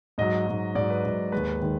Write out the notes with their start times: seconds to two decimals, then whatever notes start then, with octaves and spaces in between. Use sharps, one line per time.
0.18 G#2 F#3 D#5
0.47 G#2 F#3
0.75 G#2 F#3 D5
0.90 B4
1.04 G#2 F#3
1.32 D#2 D#3 G#3 B4
1.62 D#3 G#3